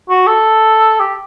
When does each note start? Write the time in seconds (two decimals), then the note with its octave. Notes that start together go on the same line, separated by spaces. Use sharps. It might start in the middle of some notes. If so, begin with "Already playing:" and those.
0.10 F#4
0.27 A4
1.00 G4